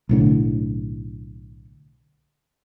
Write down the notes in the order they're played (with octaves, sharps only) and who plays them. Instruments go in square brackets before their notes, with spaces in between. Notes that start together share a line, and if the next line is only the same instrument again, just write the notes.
[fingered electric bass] B1 A2 D3